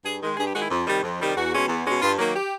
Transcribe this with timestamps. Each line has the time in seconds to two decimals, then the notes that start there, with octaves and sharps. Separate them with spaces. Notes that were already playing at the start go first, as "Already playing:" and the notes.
0.04 G2 G#4
0.22 D#3 G#3
0.37 G2 G#4
0.47 G4
0.54 D#3 G#3 F#4
0.62 E4
0.71 F2
0.87 C3 D#3 G3
1.03 F2
1.20 C3 D#3 G3
1.36 E2 F#4
1.52 B2 G#3 C#4
1.68 E2
1.85 B2 G#3 C#4
2.01 G2 F4
2.17 D#3 F#3 A#3
2.34 G4